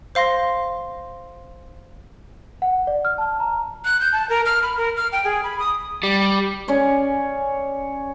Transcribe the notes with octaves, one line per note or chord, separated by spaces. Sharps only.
C5 F5 C6 A#6
F#5
D5
F6
A5
A#5
F#6
G6
A5
A#4
F6
B5
A#4
F6
G5
G#4
B5
D#6
G3
C#4 G#4 C#5 D5